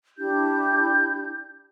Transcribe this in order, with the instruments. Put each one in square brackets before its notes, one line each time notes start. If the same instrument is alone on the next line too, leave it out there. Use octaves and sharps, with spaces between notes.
[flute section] D4 E4 G4 G6